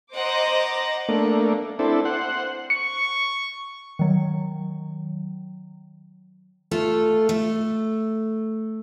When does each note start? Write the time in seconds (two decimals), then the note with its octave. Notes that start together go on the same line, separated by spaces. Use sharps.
0.15 C5 D#5 F#5 A#5 D6
1.09 A3 A#3 D4
1.79 C4 D4 E4 A4
2.05 C5 F#5
2.70 C#6 C#7
3.99 D#3 F#3
6.71 A3 F4 A4
7.29 A3